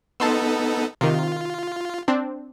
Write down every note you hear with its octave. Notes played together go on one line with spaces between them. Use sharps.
B3 D#4 A4 A5 C6 E6
C3 D#3 F4
C4 D4